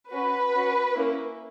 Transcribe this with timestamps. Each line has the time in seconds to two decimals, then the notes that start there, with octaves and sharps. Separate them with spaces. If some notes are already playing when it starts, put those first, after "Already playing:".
0.11 C#4 F#4 B4
0.54 C#4 F#4
0.95 A#3 C#4 E4